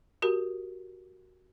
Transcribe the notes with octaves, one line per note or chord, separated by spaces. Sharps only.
F#4 G4 A#4